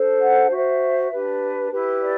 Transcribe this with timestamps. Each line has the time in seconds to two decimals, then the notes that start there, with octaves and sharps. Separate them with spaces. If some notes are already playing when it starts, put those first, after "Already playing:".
Already playing: D4 A4 C5
0.20 F#5
0.50 F#4 C5 E5
1.11 D4 G4 B4
1.71 E4 G4 B4
2.00 D5